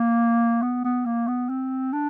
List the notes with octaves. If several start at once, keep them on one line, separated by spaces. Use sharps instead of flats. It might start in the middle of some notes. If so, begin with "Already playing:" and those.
Already playing: A#3
B3
B3
A#3
B3
C4
D4